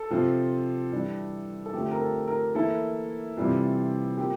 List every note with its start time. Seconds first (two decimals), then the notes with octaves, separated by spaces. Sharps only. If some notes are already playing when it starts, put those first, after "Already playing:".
Already playing: A4
0.11 C3 F3 C4 F4
0.92 E3 G3 D4
1.66 A4
1.73 D3 F3 A3 C4 G4
1.91 A#4
2.01 A4
2.28 A#4
2.55 E3 A#3 E4 A4
3.37 C3 E3 G3 C4 F4
4.18 F3 A#3 G4